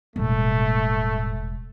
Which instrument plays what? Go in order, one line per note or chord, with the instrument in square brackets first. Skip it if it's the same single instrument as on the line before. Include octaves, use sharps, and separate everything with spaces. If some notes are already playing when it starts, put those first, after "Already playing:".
[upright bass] E1 [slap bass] A2 G3 B3 [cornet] A3